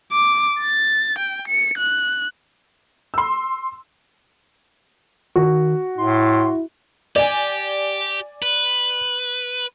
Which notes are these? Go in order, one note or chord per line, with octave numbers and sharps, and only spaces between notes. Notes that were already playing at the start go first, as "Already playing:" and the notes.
D6
A6
G5
C#7
F#6
C6 E6
D#3 F#4
A2 E4 C6
G4 D5 G#5
B4